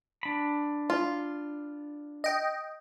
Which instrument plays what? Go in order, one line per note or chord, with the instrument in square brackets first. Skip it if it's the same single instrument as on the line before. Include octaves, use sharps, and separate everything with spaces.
[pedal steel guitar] D4 B5
[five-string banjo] F4
[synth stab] D#5 G5